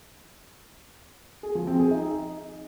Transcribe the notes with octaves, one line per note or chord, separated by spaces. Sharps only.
G#4
F3
C4
G#4
D#4